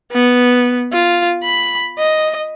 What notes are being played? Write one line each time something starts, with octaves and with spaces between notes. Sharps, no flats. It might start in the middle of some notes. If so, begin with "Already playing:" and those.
B3
F4
B5
D#5